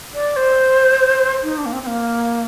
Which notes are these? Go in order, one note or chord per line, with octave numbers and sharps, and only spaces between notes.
D5
C5
D#4
D4
A#3
C4
C4
A#3